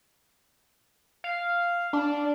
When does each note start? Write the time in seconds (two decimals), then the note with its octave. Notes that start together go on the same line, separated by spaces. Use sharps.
1.24 F5
1.93 D4